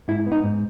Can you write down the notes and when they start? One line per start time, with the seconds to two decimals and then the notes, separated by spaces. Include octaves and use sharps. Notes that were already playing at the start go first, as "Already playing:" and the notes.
0.08 G#2 E4
0.26 B3
0.32 D#4
0.44 G#2